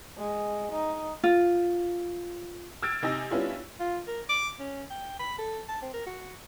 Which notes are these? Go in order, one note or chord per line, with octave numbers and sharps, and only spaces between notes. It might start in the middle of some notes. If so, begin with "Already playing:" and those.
G#3
D#4
F4
E6 F6 G#6 A6 D7
C3 D#4 G#5 E6 A#6
G3 B3 C#4 D4 E4 F4
F4
A#4
D6
C#4
G5
B5
A4
A5
C4
A#4
F#4